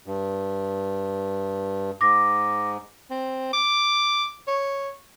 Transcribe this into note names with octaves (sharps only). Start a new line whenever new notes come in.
G2
G#2 D6 A#6
C4
D6
C#5